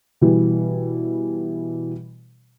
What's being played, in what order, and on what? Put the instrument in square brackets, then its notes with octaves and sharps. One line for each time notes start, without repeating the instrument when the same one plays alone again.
[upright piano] B2 E3 G3